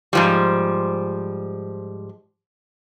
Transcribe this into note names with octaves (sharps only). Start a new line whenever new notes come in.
G#2 F3 G3